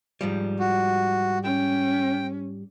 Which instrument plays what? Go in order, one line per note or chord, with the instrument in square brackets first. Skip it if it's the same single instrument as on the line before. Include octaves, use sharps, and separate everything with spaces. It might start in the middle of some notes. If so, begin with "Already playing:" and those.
[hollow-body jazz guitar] G#2 F3 G3
[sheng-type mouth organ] F#4
[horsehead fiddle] C#4 [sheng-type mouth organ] G5